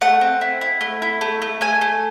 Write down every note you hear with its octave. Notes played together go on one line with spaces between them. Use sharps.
A3 F#5
C4
E4
E4
A3
E4
A3
A3
A3 G#5
A3